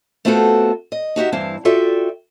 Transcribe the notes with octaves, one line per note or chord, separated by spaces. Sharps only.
A3 B3 C4 F4 F#4 A4
D#5
D#4 F#4 G4 E5
G2 E3 C4 E4 F5
F4 F#4 A4 D5 E5 G5